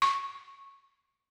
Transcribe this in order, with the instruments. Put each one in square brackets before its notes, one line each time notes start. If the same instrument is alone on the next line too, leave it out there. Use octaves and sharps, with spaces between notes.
[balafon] C#6